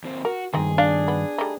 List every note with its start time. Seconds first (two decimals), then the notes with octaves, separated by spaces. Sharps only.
0.04 D#2 C4
0.25 F#4 A#4
0.54 G2 D#3 C4 D#4 G#4
0.78 D4 F5
1.08 B3
1.38 G3 A3 D#4